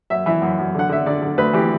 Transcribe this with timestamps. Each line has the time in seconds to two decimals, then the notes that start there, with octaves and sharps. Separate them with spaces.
0.10 F#2 E5
0.26 E3 E5
0.42 F#2
0.59 F#2
0.75 D3 F#5
0.89 D3 E5
1.06 D3 D5
1.22 D3
1.38 D2 B4
1.53 E3 G4